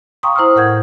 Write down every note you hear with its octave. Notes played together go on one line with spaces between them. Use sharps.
F5 G5 A#5 C6 C#6 D#6
E4 C5 A#5 D#6 F6
A2 A#4 F#5 G6 G#6